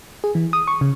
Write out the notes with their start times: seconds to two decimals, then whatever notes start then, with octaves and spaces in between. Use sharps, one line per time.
0.24 G#4
0.35 E3
0.53 D#6
0.68 C#6
0.81 C#3